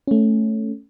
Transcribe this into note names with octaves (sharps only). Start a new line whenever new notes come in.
A3 C#4